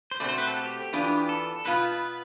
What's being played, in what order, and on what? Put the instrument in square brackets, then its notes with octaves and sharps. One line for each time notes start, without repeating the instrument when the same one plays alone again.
[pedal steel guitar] C5
[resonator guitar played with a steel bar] B2 A3 C4 [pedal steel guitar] D5
[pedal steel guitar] C5
B4
A4
G4
[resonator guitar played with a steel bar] E3 B3 D4 F4
[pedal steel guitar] A4
[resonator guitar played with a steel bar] B2 B3 F4 [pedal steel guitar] B4